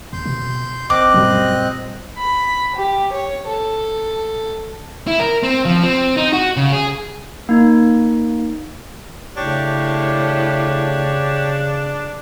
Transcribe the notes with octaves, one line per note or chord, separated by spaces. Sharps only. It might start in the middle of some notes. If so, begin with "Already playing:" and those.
D#2 C6 G6
B2
G#1 C4 D#5 D6 F#6
F#2 A#2 G3
B5
G4
C#5
A4
E4
A#4
C4
F3
C4
D#4
F#4
C#3
G#4
A#3 D#4
A2 C#3 D4 G4 C#5